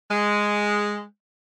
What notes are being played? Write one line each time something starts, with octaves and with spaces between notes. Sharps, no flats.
G#3